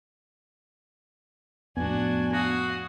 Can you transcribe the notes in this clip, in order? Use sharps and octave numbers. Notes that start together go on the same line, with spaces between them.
F2 A2 B3 D4 F#4 G#5
F#4 F5 D#6